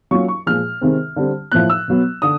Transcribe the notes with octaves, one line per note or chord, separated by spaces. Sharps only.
F#3 A#3 C#4 F4 C#6
C#6
A#2 F3 G#3 F6
C3 D#3 G#3 C4
D3 G3 C4
A2 F3 A#3 F#6
E6
B2 F#3 B3
D3 D#6